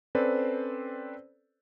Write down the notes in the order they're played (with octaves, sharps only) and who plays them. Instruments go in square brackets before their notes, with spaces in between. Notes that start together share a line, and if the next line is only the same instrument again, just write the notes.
[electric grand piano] C4 C#4 A4 B4 C5 D5